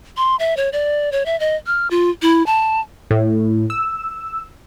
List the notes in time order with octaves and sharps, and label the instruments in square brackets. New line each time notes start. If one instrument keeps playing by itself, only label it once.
[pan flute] C6
E5
C#5
D5
C#5
E5
D#5
F6
F4
E4
A5
[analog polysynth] A2
E6